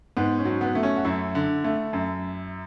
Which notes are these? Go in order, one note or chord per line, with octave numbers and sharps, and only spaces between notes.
G#2 B3
C#4
F#3
B3
A3
C#4
F#4
F#2 E4
D3
A3
F#2